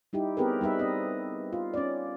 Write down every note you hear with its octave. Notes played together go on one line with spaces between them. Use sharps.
G3 D#4 E4 G4
B3 C4 G4 G#4 A#4 B4
G3 D#4 B4 E5
C4 D#5
F4
C#4 D5